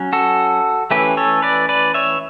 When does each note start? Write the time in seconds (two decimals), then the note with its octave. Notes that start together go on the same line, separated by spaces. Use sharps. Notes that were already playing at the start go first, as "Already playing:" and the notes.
Already playing: F#3 C#4
0.13 F#4 A4
0.91 E3 A3 C#4 G4 B4
1.17 A4 C#5
1.42 B4 D5
1.69 B4 D5
1.94 C#5 E5